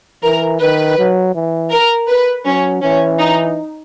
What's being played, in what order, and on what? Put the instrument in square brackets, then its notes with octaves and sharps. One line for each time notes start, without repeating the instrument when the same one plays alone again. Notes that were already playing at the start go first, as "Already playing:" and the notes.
[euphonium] E3 [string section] A#4
[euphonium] D#3 [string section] B4
[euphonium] F#3
E3
[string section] A#4
B4
[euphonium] F#3 [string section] C#4
[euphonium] E3 [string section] C#4
[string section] D#4